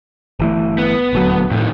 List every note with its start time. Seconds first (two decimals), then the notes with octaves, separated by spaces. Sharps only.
0.39 G1 E3 A3
0.78 B3
1.13 D#1 D2 F#3
1.51 F2 A2 D#3